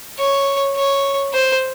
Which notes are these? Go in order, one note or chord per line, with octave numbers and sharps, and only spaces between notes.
C#5
C#5
C5